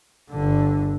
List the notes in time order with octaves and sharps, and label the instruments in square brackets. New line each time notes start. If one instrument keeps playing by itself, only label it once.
[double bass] G1 D3